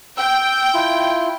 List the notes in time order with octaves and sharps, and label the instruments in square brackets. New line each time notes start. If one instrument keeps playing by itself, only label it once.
[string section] G5 [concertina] E6
[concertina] E4 F4